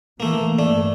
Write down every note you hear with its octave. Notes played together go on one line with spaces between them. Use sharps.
E3 A3 A#3
G2 A3 D5